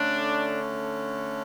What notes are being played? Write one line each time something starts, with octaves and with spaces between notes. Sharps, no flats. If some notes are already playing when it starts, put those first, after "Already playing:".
Already playing: D3 A3 C#4 D4